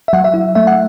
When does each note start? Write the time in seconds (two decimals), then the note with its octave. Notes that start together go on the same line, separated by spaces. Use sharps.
0.08 E5
0.13 F#3 F#5
0.24 E5
0.34 E4
0.55 A3 E5
0.67 F#5